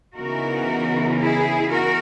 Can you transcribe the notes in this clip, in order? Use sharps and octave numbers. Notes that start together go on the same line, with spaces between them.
C#3 E3 B3 D#4 F#4 A#4
E4 G#4
F#4 A#4